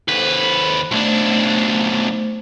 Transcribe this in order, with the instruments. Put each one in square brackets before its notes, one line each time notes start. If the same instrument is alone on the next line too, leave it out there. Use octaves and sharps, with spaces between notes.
[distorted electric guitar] D#2 B4 [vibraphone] A4 C5
[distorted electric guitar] B1 D4 [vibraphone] A3 C5